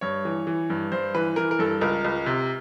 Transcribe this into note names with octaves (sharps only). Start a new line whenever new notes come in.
G2 C#5
E3
E3
G2
G2 C5
E3 B4
E3 A#4
A#4
G2 A4
C#2 A#4
C#2
C3